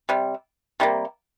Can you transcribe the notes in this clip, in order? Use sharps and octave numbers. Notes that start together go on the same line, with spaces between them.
C3 G3
C3 G3 A#3